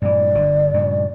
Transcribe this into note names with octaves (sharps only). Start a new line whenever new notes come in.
G2 A#2 E3 D5
G1 D3
G2 A#2 C#3